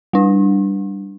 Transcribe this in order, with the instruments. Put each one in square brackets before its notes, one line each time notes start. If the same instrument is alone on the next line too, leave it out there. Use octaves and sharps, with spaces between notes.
[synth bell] G3 D4